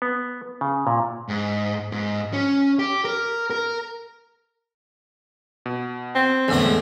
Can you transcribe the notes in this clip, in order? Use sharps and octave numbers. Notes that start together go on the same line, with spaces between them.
B3
C#3
A#2
G#2
G#2
C#4
G4
A#4
A#4
B2
C4
E2 A2 D3 A3
G#3